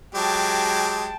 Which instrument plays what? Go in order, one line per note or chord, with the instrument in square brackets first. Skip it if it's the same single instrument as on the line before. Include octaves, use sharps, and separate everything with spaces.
[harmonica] F#3 G#3 G4 [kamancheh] G5 A5